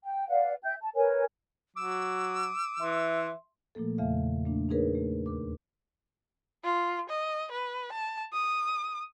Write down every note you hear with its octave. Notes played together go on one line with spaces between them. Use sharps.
G5
B4 D5 F5 F#5
E5 G5 G6
A5
A#4 B4 C#5 G#5
F#3 D6 E6
E3 E5 C6
A#2 F3 A3 A#3 A4
E2 C#3 A3 E5 F5
A3 A#3 D4
D4 D#4 G#4 A#4 B4 C#5
A3
D#2 A#4 D6
F4
D#5
B4
A5
D#6